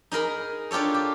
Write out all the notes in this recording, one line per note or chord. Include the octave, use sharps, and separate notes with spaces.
D#4 G#4 A#4 B5
D4 F4 G4 A4 C#5
G4